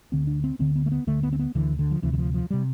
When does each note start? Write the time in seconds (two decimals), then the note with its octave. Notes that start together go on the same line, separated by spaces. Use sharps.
0.12 D2 D3 C4
0.27 D4
0.44 C4
0.59 D2 D3 C4
0.76 B3
0.86 A3
0.92 B3
1.07 D2 D3 A3
1.23 B3
1.33 C4
1.39 B3
1.55 D2 D3 E3
1.79 D3
1.91 F3
2.02 D2 C3 E3
2.13 E3
2.18 F3
2.34 F3
2.51 C3 G3